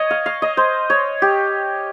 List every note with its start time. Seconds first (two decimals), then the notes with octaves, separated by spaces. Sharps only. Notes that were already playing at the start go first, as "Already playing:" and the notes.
Already playing: C#5 D#5
0.11 F5
0.26 F5
0.42 D#5
0.57 C5
0.90 C#5
1.22 G4